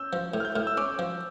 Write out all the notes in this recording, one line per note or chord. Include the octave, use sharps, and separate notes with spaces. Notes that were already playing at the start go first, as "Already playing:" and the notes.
Already playing: C#4 E6 G6
F3
A2
F6
G6
A2 F6
E6
C#4 D6
F3